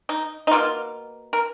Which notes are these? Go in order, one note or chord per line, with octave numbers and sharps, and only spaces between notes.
D#4
D#4
B2 A#3 F4
A#4